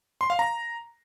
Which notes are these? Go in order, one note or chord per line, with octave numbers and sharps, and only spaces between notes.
C6
F5
A#5